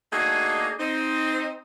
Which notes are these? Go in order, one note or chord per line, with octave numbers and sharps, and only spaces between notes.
A3 A#3 D4 D#4 F#4 G#4
C4 D#4